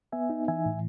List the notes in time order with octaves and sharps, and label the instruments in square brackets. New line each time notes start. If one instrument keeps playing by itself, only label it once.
[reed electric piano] B3 E5 G#5
D#4
E3 E5 G#5
A2